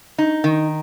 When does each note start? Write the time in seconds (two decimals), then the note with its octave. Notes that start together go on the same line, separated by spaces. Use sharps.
0.18 D#4
0.44 D#3